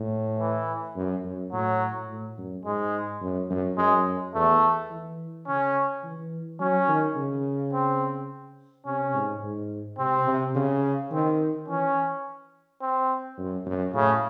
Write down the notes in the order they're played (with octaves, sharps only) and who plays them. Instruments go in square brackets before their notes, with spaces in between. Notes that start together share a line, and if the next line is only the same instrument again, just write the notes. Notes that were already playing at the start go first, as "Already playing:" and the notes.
Already playing: [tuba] A2
[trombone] E3
[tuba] F#2
F#2
[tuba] A2 [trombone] F#3
[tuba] A2
F#2
[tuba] G#2 [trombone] G#3
[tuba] F#2
F#2
[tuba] F#2 [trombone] G#3
[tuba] E2 [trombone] A3
[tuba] E3
[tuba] C#3 [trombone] C#4
[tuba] E3
[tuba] F#3 [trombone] C#4
[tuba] D#3
C#3
[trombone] C4
[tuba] C3 [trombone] C#4
[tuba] G#2
G#2
[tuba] C3 [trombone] C4
[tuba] C3
C#3
[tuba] D#3 [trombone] C4
[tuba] E3 [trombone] C#4
[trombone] C4
[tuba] F#2
F#2
[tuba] A2 [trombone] C#3